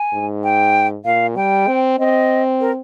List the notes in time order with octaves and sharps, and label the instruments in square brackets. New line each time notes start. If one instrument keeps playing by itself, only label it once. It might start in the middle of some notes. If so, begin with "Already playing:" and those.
Already playing: [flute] G#5
[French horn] G#2
[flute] G5
[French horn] A#2 [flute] F5
[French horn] G3 [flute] G5
[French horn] C4
[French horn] C4 [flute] D#5
[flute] A#4